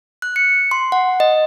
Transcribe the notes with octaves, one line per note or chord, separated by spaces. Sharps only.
F#6
C#7
C6
F#5
D#5